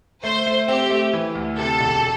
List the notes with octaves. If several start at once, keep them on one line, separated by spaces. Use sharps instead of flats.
A3 C5
A3
C4 G4
A3
E3
D2
C3 A4
E1